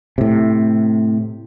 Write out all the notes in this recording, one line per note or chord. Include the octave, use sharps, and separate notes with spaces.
A2 C3